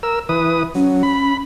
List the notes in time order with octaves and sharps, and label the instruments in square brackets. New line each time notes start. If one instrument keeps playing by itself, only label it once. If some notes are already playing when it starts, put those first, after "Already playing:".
[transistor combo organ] A#4 E6
E3 B4 D#6
[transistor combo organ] F#3 [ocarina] C#4
[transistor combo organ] B5